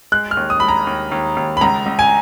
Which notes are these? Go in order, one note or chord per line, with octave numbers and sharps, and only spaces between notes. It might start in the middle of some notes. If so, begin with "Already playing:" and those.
G#3 F#6
F6
D#2
D#6
G#3 B5
A#5
D#2
D#2
D#2
B5
C#2 A#5
C#2
G#5